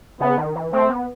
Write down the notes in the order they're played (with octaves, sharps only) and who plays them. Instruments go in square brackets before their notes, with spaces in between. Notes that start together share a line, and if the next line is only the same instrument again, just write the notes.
[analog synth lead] C#3 [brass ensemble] B3
[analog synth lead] D#3
E3
[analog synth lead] A3 [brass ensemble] C4
[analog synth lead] B3